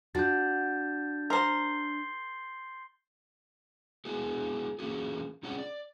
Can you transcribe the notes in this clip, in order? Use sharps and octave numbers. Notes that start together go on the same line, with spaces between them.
D4 F4 F#4 G6 A6
A#4 C5 C6 C7 G7
G#3 B3 E4 F#4 G#4
E3 A#3 C#4 F#4 G#4
G#3 C4 C#4 G#4 C#5 F#5
D5